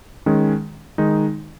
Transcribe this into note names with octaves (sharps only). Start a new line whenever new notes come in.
D#3 G#3 C#4
D#3 G#3 D#4